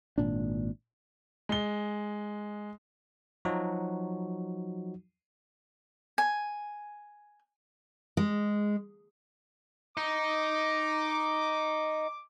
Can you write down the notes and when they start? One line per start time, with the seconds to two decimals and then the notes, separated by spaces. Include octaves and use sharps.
0.18 G#1 A#2 D4
1.49 G#3 G7
3.45 F3 F#3 D#4 F#4
6.18 G#5
8.17 G#3
9.97 D#4 D6